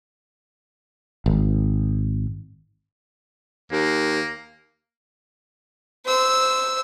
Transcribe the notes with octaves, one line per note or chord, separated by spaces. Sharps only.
G#1
D#2 A#3
C5 E6